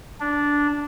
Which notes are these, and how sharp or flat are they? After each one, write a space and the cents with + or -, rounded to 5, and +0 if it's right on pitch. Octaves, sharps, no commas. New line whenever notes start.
D4 -10